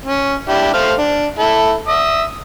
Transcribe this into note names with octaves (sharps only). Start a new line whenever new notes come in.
C#4
D4 E4 G4
A3 C5 F5
D4
E4 A4
E5 D#6